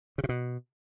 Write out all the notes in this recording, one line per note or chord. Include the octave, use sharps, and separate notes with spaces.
C#3
C3
B2